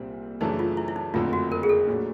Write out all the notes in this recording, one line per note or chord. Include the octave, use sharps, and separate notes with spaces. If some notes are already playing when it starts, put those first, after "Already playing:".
Already playing: C2 A#2 G3 C4
F#2 C#3 E3 A3 D4 D#4
F4
E4
E4
D#4
F#1 F2 D3 F3 A3 F4
F#4
A#4
G#4
A4
A#2 F#3 A3 D4